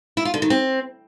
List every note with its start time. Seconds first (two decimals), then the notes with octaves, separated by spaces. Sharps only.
0.17 E4
0.25 F4
0.34 D3
0.42 D#3
0.50 C4